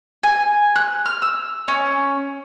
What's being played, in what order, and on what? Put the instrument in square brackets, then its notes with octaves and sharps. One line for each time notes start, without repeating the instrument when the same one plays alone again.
[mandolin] G#5
F#6
F6
E6
C#4